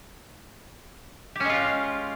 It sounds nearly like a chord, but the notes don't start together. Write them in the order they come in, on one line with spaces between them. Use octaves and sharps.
G4 C#4 G#3 F4